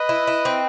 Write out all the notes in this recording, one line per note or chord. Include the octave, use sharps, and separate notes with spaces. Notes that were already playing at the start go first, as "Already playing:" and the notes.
Already playing: B4 D#5
E4
E4
C4